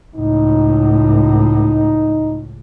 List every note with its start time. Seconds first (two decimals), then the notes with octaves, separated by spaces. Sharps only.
0.16 C#2 A2 D#4